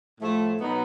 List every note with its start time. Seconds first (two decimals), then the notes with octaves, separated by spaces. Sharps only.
0.20 A2 F3 A3
0.61 B2 F#3 B3 D#4